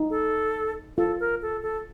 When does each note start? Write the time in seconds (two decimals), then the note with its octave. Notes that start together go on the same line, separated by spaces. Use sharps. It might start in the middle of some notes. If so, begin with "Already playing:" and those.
Already playing: D#4
0.10 A4
0.97 F4 A4
1.20 A#4
1.42 A4
1.62 A4